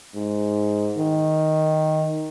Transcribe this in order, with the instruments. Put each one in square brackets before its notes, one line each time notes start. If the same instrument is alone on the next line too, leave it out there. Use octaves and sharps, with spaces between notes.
[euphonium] G#2
D#3